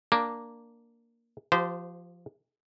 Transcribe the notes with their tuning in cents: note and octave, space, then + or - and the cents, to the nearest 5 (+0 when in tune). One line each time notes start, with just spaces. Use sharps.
A#3 +0 D4 +0
F3 +0 G4 -20 C5 -25